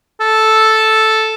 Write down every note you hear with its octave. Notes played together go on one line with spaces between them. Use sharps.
A4